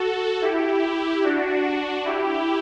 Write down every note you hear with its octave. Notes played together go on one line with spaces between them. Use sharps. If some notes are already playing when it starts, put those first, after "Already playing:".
Already playing: F#4 A4
E4 G4
D4 F#4
E4 G4